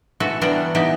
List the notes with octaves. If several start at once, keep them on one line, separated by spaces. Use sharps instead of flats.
E3 F#4 A4 E5
E3 G3 B3 D4 D5 A#5
E3 B3 D#4 G4